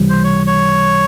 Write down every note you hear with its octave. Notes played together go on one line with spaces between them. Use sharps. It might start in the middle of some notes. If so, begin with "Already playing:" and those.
Already playing: C#2 C3 E3 G3
C5
C#5
C#5